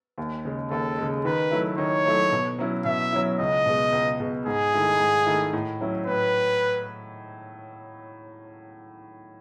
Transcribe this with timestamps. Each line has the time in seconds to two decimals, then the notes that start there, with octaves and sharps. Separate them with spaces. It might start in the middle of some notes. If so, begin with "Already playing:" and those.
0.18 D#2
0.45 C#3 G#3
0.70 D#2 A4
0.97 C#3 G#3
1.25 D#3 B4
1.51 F#3 A3 E4
1.78 D#3 C#5
2.05 F#3 A3 E4
2.32 B2
2.59 F#3 C#4 E4
2.85 B2 E5
3.13 F#3 C#4 E4
3.39 C#2 D#5
3.66 B2 G#3
3.92 C#2
4.20 B2 G#3
4.46 G#2 G#4
4.73 D#3 A3 E4
5.00 G#2
5.26 D#3 A3 E4
5.53 A2
5.81 F#3 C#4 E4
6.07 A2 B4